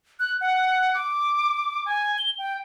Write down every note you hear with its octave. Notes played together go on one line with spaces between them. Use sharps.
F#6
F#5
D6
G#5
G7
G5